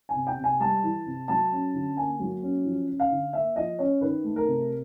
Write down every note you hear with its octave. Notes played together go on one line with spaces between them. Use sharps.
G#5
C3
G5
C3
G#5
G3 A5
E3
C3
F#3 A5
C#4
D3
A#3 G#5
F#3
C#4
F3
C#4
F5
D3
A#3 E5
F3 D#5
C#4 C#5
D#3 B4
A3
A#4
C3